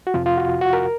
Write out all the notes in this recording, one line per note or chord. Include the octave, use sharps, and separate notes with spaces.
F#4
F2 C3 F3 F4
F4
F#4
F#4
A#4